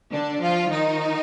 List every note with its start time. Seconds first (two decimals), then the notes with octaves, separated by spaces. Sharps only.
0.12 D3 D4
0.41 F3 F4
0.70 D#3 D#4